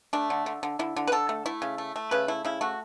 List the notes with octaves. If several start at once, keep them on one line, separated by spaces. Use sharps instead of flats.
A3 D4
D3
D3
D3
D3 E4
D3
B4
D3 A4
A3
A3 E4
C#3
A3
A3
C#3 B4
A3 E4
C#3 E4
A3 F#4